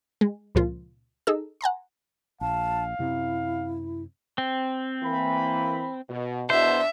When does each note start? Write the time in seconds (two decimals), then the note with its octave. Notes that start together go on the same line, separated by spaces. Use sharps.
0.21 G#3
0.55 C#2 A#2 F3 F4
1.27 D#4 G#4 A4 E6
1.61 F#5 G#5 A#5 C6
2.41 A#1 F5 A5
2.99 F#2 C3 C4 E4
4.38 C4
5.03 E3 A#3 B5
6.09 B2
6.50 E2 B2 D4 C5 E5